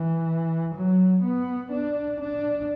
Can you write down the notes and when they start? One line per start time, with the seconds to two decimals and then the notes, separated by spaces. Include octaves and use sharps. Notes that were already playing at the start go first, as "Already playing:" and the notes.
Already playing: E3
0.75 F#3
1.23 B3
1.72 D4
2.20 D4